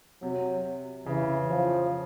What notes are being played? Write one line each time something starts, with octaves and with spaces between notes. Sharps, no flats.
C3 F#3
C#3 E3
F3